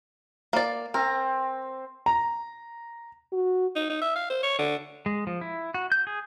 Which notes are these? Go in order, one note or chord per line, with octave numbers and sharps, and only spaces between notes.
A#3 D5
C4 A#4
A#5
F#4
D#4
D#4
E5
F5
C5
C#5
D3
G#3
F3
E4
F#4
G6
G#4